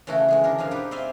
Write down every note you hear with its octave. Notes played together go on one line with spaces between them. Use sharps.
C#3 E3 A3 B3 F#4
E2 G#3 G#4
D3 D4 A#4
F#2 B2 F3 D#4 F5
G3 D#4 G4 B4
C4 D5 E5 F5 G5 G#5